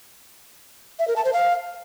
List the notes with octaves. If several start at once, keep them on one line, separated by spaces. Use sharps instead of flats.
E5
A#4
A5
C5
F5